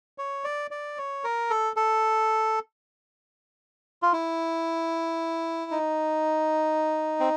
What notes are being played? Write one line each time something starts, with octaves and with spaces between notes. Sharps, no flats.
C#5
D5
D5
C#5
A#4
A4
A4
F4
E4
D#4
C4